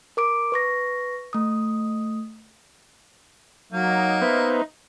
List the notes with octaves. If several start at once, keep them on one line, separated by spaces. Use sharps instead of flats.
A#4 D6 D7
B4 C#6 A#6
A3 D#6
F#3 A#3 D#4
B3 B4 C5 E5